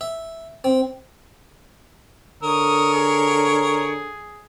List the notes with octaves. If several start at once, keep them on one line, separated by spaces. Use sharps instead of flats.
E5
C4
D3 A#4 C#5 D#6
G#4